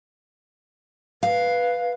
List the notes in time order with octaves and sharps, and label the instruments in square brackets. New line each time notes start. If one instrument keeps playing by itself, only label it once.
[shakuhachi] B4 [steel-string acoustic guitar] F5